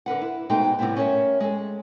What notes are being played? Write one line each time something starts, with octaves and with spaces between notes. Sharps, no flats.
D3 A#4 B4 F#5
E4
G#2 B2 G#3 A3 D#4 G5
A2 C3 F3 G3 B3 E4
C#4 A#4 C#5 E5
G#3 A4